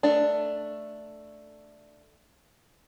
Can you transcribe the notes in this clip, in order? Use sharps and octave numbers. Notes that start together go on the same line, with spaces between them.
A3 D4